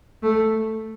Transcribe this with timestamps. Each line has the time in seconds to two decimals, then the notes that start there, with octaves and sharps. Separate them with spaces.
0.23 A3